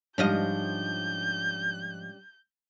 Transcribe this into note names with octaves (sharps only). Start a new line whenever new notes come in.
G#2 F3 G3 C#4 D4 D#5 G6